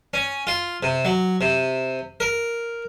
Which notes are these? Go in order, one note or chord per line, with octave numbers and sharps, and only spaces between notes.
C#4
F4
C3
F#3
C3
A#4